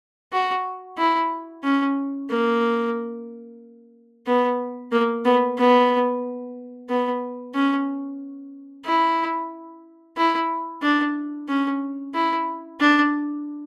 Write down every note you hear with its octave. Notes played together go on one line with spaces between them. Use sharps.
F#4
E4
C#4
A#3
B3
A#3
B3
B3
B3
C#4
E4
E4
D4
C#4
E4
D4